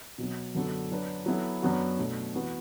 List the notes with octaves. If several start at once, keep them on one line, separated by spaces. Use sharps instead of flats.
B2 F#3 B3
F#2 D3 B3 F#4 A4
F#3 D4 B4
F#3 B3 E4 A4
F#2 F#3 B3 D4 F#4
B2 A3 D4
E3 B3 F#4 B4